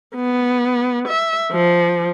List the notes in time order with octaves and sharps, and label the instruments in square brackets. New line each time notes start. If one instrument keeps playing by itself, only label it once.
[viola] B3
E5
F3